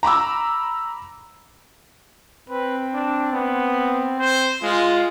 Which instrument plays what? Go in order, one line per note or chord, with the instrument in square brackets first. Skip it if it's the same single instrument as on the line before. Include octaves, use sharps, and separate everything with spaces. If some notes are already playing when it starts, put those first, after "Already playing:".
[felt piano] A#5 B5 D6 E6
[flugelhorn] C4 [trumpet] B4
[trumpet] D4
B3
C5
[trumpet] G#3 [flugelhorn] F4